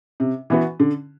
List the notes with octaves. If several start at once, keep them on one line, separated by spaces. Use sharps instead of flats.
C3
E3 B3 F#4
D3